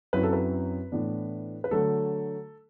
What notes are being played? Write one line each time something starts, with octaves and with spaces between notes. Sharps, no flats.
F#2 F#3 C4 E4 B4
A4
B4
A2 E3 B3 D4
B4
D3 F#3 A3 A4